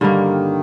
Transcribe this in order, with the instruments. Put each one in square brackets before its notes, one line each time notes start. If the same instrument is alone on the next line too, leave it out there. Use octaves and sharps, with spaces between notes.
[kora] G2 D3 G3 A#3 [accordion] D#3